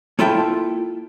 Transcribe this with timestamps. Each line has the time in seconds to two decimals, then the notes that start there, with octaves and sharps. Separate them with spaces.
0.19 A#3 E4 F4 A4 E5 G5